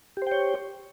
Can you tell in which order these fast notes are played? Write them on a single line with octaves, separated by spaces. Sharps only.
G4 C5 G5 C#5